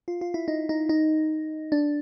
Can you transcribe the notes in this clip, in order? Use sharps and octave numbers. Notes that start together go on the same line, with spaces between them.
F4
F4
E4
D#4
D#4
D#4
D4